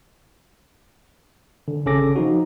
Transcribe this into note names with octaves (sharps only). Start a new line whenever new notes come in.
D3
G#1 C#3 C#4 A4 D6 A#6
F3 D#4 F#4